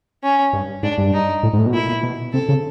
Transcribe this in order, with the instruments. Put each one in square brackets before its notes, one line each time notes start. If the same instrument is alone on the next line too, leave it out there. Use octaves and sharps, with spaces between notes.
[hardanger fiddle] C#4
[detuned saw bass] G2
[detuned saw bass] G#2 [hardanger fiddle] D4
[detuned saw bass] G2
[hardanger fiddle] D#4
[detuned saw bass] A2
G#2
A2
B2
[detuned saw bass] A#2 [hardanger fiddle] E4
[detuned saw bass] A#2
B2
[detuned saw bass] C3 [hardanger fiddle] A4
[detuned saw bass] C#3